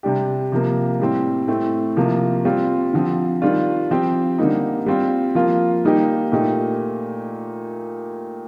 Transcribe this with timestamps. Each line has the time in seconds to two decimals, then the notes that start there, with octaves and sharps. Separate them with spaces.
0.03 C3 G3 D4 G4
0.52 C3 F3 A#3
1.00 A2 G3 C4
1.48 A2 A3 C4
1.97 C3 F3 A#3
2.45 G3 C4 F4
2.93 D3 F3 C4
3.42 D#3 G3 D4 F4
3.91 F3 C4 G4
4.38 D3 G3 A#3 D#4
4.86 G3 C4 F4
5.35 F3 A#3 F4
5.84 D#3 G3 A#3 D#4 G4
6.32 A#2 A3 D#4 G4